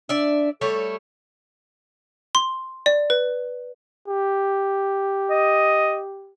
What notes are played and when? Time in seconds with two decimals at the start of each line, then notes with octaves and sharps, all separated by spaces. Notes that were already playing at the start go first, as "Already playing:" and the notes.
0.09 D4 D5 E5
0.61 G3 A3 A4 C#5
2.35 C6
2.86 D5
3.10 B4
4.08 G4
5.30 D#5